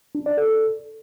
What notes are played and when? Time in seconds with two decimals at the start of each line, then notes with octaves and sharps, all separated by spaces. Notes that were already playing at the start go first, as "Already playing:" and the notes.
0.15 D4
0.26 D5
0.38 A4